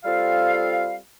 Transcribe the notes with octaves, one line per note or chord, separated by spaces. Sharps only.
G3 C4 F4 A4 F5